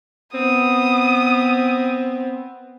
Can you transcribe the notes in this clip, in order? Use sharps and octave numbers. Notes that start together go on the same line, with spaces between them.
B3 C4 D#6